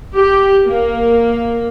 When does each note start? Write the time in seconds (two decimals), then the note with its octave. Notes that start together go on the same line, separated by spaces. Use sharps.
0.14 G4
0.66 A#3